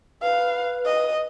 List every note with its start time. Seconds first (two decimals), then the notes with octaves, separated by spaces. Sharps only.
0.22 B4 F5
0.85 D#5